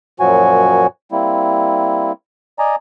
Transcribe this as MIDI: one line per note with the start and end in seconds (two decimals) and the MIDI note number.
0.20 0.87 42
0.20 0.87 46
0.20 0.87 53
0.20 0.87 54
0.20 0.87 66
0.20 0.87 80
1.12 2.12 55
1.12 2.12 58
1.12 2.12 60
1.12 2.12 64
2.59 2.76 74
2.59 2.76 75
2.59 2.76 80
2.59 2.76 82